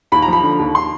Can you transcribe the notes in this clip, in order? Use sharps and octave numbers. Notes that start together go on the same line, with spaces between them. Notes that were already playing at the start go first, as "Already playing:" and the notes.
D#2 B5
A#5
F3 B5
D3
D#2
C6